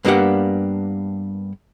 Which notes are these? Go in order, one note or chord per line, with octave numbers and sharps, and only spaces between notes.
G2 A#3 B3 D4 G4 F#5